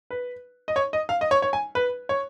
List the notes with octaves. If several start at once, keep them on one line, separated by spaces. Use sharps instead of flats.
B4
D#5
C#5
D#5
F5
D#5
C#5
C#5
G#5
B4
C#5